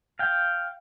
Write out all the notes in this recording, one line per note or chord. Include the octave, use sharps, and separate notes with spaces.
F5 G5